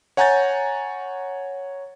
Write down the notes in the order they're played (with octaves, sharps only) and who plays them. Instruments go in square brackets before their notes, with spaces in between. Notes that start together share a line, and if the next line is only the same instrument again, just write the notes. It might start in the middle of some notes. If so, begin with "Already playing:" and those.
[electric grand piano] C#5 F#5 G#5 A#5 G6 A6